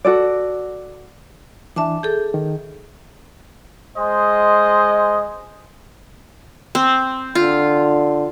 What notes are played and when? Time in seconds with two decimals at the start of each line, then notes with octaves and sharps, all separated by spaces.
0.05 F#4 A4 D5
1.76 E3 D4 E5 A5 D6
2.03 G#4 A4 G6
2.34 D#3
3.97 G#3 C5 D#5
6.75 C4
7.35 D3 F4